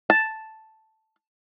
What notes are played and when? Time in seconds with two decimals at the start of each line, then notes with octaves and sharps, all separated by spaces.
0.10 A5